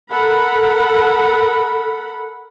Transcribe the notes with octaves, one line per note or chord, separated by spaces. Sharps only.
A4 A#4 F#5 B5